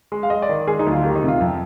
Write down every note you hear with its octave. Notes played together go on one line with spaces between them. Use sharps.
G#3
F5
G#3 D#5
D5
D#3
G#3 G#4
D#4
D2
F4
D#3 G4
D#4
C3
F4
F2